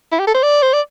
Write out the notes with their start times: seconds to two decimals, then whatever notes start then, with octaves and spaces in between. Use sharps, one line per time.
0.12 E4
0.19 G4
0.27 A4
0.34 C5
0.43 D5
0.62 C5
0.73 D5